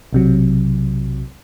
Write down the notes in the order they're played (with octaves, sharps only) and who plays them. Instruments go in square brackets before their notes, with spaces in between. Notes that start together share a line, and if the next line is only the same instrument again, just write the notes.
[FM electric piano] B1 C3 F#3